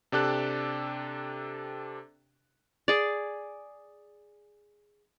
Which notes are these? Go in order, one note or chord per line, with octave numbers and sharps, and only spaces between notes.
C3 D4 G4 A4 F#6
G#4 D5